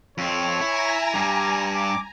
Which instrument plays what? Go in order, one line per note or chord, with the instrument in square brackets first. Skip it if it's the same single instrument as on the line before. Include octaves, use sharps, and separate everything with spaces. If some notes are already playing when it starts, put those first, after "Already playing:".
[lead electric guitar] F2 C4 [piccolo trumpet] C#5
[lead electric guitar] E4 [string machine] G#5 A#5
[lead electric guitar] G2 G3 [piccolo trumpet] D6
[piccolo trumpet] D6